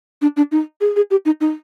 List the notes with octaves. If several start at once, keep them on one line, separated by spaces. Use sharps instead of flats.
D4
D4
D#4
G#4
G#4
G4
D#4
D#4